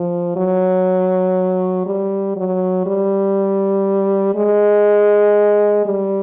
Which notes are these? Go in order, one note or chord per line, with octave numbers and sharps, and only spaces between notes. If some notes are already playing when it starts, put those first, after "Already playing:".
Already playing: F3
F#3
G3
F#3
G3
G#3
G3